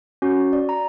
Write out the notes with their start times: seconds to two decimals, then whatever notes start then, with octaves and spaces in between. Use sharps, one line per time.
0.22 C#4 F#4
0.53 D5
0.69 A#5